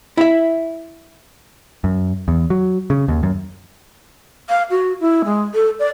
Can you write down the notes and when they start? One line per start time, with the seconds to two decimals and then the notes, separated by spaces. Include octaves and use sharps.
0.17 E4 E5
1.84 F#2
2.28 E2
2.50 F#3
2.90 C#3
3.08 D#2
3.23 F#2
4.49 F5
4.70 F#4
5.01 E4
5.25 G#3
5.55 A4
5.79 D5